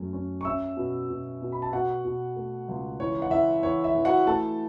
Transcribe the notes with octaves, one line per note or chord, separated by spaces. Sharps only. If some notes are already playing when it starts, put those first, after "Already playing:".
Already playing: F#2 A3 C#4
C#4
C#6
C#4 E5 E6
B2
B2
B2
B5
A5
B2 F#4 F#5
B2
A3
C#2
E3 C#5
F#5
E3 E5
E3 C#5
E5
E3
F#4 F#5
A3 A4 A5